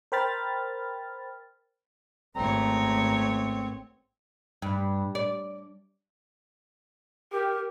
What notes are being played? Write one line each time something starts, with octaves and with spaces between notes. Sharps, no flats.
A#4 C5 G5 B5 F6 A6
G#1 A3 B3 C4 C#5 A#5
G2
D5
G4 A#4